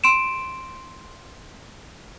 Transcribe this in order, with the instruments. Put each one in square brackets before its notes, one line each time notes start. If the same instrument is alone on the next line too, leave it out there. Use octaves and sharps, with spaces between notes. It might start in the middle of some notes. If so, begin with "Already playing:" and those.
[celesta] C6 D7 E7